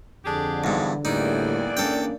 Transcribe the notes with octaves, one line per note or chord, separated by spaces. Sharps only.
F2 D3 D4 G4 G#4
E2 G2 F3 G#3 D#4
E2 A2 G3 A#3 D#4 D5
A#3 C#4 D4 A4 G5